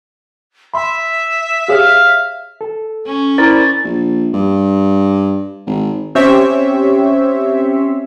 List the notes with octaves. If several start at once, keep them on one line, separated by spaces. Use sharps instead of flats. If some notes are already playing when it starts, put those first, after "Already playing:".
E5 B5 C6
G4 G#4 C#5 F5
A4
C#4
E4 A#4 C5 D5 A6
A#1
G2
G#1
C4 C#4 G4 C5 C#5 E5